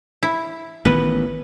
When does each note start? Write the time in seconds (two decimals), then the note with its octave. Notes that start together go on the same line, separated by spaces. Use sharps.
0.23 E4
0.85 A1 D#3 B3 B4